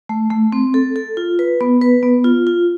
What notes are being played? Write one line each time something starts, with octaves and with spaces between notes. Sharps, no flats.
A3
A3
C4
A4
A4
F4
B4
B3
B4
B3
F4
F4